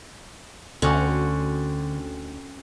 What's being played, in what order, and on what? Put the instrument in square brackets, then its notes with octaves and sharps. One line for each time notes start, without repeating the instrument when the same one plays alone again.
[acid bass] D2 [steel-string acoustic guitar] D3 [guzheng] C4 C#4 F#4